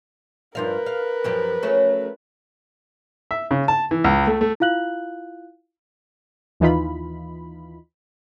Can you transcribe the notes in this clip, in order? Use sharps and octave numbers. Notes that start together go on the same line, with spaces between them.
G2 F3 A#4 B4 F5
F5
F#2 F3 G4
F#3 A3 C#4
E5
C#3
A5
E3
C#2
A3
A3
E4 F4 F5 F#6 F#7
D#2 E3 D#4 F4 B5